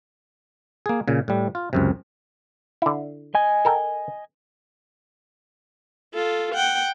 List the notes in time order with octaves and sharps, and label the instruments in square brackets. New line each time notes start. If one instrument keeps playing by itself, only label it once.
[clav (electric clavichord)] A#3 G#4
A#2 C#3
A2 G3
F4
C#2 F#2 C3
D3 E4
[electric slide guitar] D#5 G#5
[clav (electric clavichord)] A4 A#4 G5
[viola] F4 A4
F#5 G5